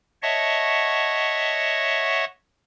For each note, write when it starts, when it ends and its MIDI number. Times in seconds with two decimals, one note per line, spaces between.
0.22 2.25 73
0.22 2.25 75
0.22 2.25 76
0.22 2.25 78
0.22 2.25 81
0.22 2.25 85